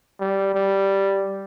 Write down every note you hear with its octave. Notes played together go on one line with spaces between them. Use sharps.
G3
G3